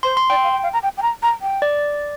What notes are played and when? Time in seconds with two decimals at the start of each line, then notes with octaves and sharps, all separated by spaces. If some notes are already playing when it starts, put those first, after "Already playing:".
0.03 C5 C6
0.17 C6
0.30 D5 G5
0.43 F5
0.53 G5
0.63 F5
0.73 A#5
0.83 G5
0.97 G5
1.02 A#5
1.23 A#5
1.42 G5
1.62 D5